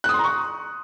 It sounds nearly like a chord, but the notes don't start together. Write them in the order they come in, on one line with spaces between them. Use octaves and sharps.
F#6 D#6 C6 A#5 C#6